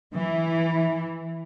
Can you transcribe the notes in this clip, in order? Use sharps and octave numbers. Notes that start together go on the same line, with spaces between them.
E3